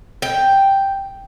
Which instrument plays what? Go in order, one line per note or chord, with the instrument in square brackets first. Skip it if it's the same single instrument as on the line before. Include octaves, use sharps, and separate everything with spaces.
[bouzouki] G5